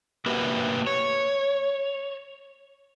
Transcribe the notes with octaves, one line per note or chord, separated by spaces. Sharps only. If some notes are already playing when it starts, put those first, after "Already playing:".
A#3 F#4 G4 B4 E5 F#5
C#5